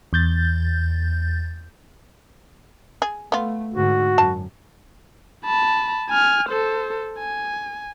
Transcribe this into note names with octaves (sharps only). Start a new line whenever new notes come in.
E2 G6 A6
G#4
A3 B3 F4
G#2 D3 F#4
F#2 A5
A5 B5
G#5 F6
A4 C5
G#5